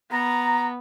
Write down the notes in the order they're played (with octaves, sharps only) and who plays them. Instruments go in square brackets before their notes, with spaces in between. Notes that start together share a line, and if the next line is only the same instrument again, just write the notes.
[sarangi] B3 [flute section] A#5